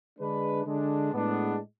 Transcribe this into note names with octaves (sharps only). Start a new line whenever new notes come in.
D3 G#3 D4 B4
D3 G#3 D4
A2 G#3 B3 D4